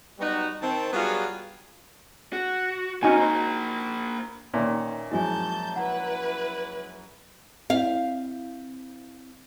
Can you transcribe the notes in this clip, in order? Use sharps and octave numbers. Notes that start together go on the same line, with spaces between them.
F#3 G3 B3 D#4 F#4
D#3 C4 A5
F#3 G3 B3 F4 F#4 G#4
F#4
C4 C#4 D#4 F#4 G#5
A#3 C5
A#2 D#3 C#4 B4 E5
F#2 F3 G#3 E4 F#4 G#5 A5 G6
E4 B4 F#5 A#5
C4 E4 F5